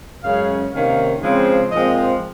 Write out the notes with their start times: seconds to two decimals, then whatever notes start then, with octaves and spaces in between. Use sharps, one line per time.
0.23 F#2 C#3 G#3 C#4 F5
0.72 C3 D#3 A#3 C#4 F5
1.22 C#3 F3 G#3 C4
1.71 A#2 F3 G#3 C4 D#5